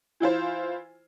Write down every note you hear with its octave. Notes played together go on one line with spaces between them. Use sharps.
E3 E4 F4 C5